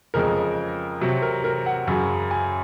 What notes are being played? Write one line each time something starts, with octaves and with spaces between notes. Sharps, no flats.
F2 C#3 G#3 A#4
C3 F#3
A#4
A#4
F#5
F#2 C#3 F#3 G#5
G#5